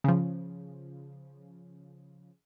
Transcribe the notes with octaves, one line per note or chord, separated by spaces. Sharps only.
C#3 F3